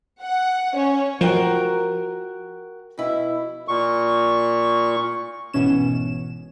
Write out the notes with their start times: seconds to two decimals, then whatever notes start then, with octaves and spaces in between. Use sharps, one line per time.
0.22 F#5
0.73 C#4 C#5
1.21 F3 F#4 A#4 G5
2.98 B2 E4
3.68 A#2 C#6
5.54 G#1 B2 E3 C#4 E7